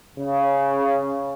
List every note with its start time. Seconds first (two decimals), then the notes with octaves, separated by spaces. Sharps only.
0.18 C#3